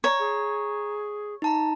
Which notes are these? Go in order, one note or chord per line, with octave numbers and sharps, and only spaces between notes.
C#5 A#5
G#4
D#4 A5 A#5